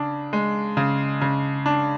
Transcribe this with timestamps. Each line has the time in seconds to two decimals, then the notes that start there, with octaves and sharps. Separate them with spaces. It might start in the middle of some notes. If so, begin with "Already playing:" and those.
Already playing: C#3 D4
0.33 G#3
0.77 C#3
1.21 C#3
1.66 D4